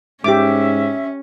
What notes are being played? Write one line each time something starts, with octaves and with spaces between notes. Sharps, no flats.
G#2 C#4 G4 E5 D6